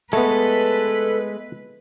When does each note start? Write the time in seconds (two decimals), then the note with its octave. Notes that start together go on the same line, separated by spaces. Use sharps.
0.13 G#3 A3 B3 A4 B4